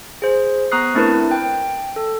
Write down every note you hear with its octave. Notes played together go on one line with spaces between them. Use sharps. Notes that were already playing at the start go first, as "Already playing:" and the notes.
G#4 C5
B3 A#5 C#6 D#6 F#6 C7
A3 C4 D4 E4 A#4 B4
G5
A4